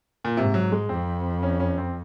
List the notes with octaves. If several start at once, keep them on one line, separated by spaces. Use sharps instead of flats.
A#2
G#2 C3
F#3
G#3
F2 C4
C#4
C#4
C4